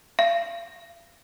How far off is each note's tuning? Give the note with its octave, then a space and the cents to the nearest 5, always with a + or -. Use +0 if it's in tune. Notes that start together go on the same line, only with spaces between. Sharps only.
F5 -45